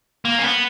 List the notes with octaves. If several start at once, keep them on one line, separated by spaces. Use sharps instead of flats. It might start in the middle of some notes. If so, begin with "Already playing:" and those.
A#3
C#4
B3